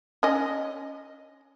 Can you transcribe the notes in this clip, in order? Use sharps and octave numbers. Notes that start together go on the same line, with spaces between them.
C#4 D#5